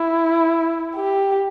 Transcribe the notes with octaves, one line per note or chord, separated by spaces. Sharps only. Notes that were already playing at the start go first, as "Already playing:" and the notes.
Already playing: E4
G4